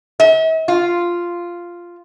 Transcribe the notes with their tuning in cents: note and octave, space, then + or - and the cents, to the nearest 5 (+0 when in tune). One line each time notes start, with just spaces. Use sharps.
E5 -45
F4 -5